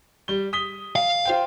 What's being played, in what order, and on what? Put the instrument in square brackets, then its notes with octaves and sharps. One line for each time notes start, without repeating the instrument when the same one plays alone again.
[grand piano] G3 G7
D#6 B6 G7
[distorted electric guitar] F5
[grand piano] F4 C5 G5